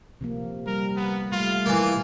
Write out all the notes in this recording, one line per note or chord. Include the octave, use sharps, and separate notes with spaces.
C3 F3 A#3
G3 A#4
B3
G3 A3 F4
E3 A#3